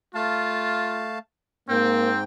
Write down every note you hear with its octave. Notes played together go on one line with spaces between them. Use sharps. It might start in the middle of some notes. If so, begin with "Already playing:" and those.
A3 F4 F5 A5
G#2 A#3 C4 G5